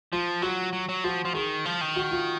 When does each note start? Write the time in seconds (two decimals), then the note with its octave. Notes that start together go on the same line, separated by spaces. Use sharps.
0.12 F3 F4
0.42 F#3 F#4
0.73 F#3
0.89 F#3
1.04 F3 F#4
1.25 F3
1.34 D#3 G#4
1.65 F3
1.81 D#3
1.96 F#4
2.11 F4